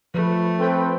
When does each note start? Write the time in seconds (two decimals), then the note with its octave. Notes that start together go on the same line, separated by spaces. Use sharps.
0.14 F3 A3 B4
0.59 C4 A4 B4 C5 G5